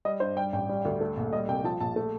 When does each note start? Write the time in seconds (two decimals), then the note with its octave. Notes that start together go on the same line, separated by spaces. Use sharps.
0.05 G3 D#5
0.20 G2 C5
0.37 G3 G5
0.53 A1 G5
0.69 G3
0.85 D2
1.01 A3
1.17 A#1
1.33 G3 D#5
1.48 C2 G5
1.64 F3 A5
1.80 A#1 A5
1.96 A3